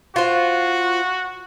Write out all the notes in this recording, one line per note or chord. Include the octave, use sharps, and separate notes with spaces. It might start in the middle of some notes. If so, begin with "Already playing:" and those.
F4 F#4 C5